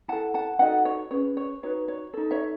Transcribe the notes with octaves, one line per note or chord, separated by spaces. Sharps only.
E4 A4 F#5 A5
F#5 A5
D#4 F#4 A4 D#5 F#5
C#5
C#4 G#4 B4 C#5
C#5
D#4 F#4 B4 C#5
C#5
D#4 A4
C#5 E5